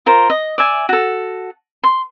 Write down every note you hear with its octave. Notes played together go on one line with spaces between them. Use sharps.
F4 A#4 C5
D#5
D5 E5 G#5
F#4 A4
C6